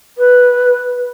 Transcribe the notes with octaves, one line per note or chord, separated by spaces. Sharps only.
B4